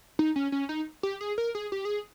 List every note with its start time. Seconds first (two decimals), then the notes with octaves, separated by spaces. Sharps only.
0.19 D#4
0.36 C#4
0.52 C#4
0.69 D#4
1.03 G4
1.21 G#4
1.38 A#4
1.55 G#4
1.72 G4
1.85 G#4